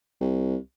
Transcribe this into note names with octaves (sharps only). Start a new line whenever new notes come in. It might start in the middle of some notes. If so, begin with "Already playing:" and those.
C2